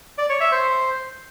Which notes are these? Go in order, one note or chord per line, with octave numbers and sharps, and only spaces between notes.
D5
C#5
E5
C5